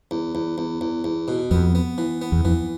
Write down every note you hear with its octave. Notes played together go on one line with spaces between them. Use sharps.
E2
E2
E2
E2
E2
B2
F2 B3
B3
E3
B3
E2
F2 E3